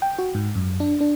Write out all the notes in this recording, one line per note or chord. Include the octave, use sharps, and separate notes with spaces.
G5
F#4
G#2
F#2
D4
D4